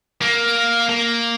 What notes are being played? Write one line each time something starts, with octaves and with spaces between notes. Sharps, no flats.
A#3
A#3